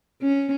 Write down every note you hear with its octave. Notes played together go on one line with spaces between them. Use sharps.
C#4